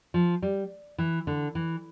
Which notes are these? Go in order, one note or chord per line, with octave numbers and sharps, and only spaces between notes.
F3
G3
E3
D3
E3